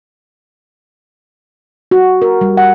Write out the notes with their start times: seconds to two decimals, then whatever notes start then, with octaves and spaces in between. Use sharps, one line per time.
1.91 F#4
2.22 A#4
2.41 G3
2.57 F#5